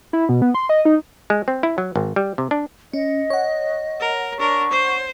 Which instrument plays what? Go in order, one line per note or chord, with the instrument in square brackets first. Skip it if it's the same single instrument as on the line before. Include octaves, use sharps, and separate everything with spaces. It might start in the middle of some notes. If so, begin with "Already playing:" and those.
[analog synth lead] E4
B2
B3
C6
D#5
D#4
[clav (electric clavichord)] G#3
C4
E4
F#3
G#1
G3
C3
D4
[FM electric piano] C#4 [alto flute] D#5
[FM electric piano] C#5 F#5
[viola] A#4
[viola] D4 A#4 [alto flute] C#6
[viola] C5